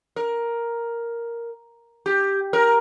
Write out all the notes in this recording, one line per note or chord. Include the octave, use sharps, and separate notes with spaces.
A#4
G4
A#4